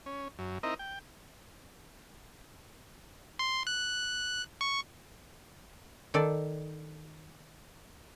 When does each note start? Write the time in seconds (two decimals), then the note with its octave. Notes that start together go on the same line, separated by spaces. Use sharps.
0.06 C#4
0.39 F#2
0.63 C4 D#4 E4 A#4 D#5
0.79 G5
3.39 C6
3.67 F#6
4.61 C#6
6.14 D#3 A4 D5